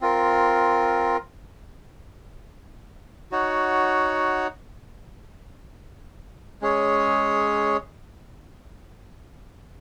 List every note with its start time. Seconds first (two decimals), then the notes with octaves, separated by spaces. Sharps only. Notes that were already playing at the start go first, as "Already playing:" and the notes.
0.01 C4 F4 A#4
3.31 D#4 F#4 C#5 F#5
6.61 G#3 C#4 G#4 C#5